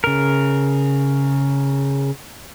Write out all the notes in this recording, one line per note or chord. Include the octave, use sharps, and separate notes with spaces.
C#3 A#4